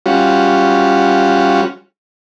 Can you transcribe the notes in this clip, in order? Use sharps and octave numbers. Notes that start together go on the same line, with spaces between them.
G3 C#4 F4 F#4